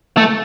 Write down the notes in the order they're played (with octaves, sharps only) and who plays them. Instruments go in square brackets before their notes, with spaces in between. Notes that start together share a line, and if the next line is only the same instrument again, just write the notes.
[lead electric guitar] A3